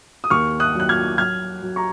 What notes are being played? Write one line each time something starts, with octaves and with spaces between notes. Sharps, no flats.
D#6
D#2 C#6 F6
D#6 F#6
F#3 F#6
F6 G#6
F#3 F6 G#6
F#3
A#5 C#6